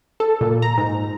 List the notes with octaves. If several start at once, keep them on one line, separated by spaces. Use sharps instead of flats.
A4
A#2
A#5
G#2